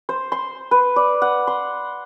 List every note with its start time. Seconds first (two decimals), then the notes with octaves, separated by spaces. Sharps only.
0.09 C5
0.32 C6
0.71 B4
0.96 D5
1.22 F#5
1.47 C6